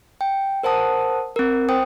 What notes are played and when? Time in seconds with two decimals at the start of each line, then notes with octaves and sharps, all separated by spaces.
0.21 G5
0.63 A#4 C5 F#5 A5 D#6
1.36 C4 A#4
1.69 C5 G5 D#6